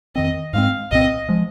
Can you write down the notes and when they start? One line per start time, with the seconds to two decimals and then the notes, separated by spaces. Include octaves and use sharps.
0.15 F2 D#3 C4 D#5
0.53 G#2 G#3 C4 F5
0.91 C2 A#2 G#3 C4 D#5
1.29 F3 G#3